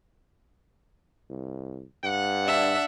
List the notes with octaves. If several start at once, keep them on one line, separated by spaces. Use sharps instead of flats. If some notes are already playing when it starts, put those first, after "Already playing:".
C2
G2 F#5
D4 E5